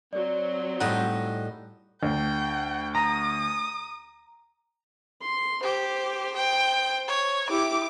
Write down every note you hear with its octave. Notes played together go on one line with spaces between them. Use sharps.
F#3 C4 D5
A2 G3 D#4 F#5
D2 G5
A#5 D#6
C6
G4 C5
G5
C#5
E4 G4 D6